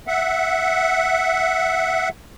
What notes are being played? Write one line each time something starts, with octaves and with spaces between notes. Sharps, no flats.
E5 F#5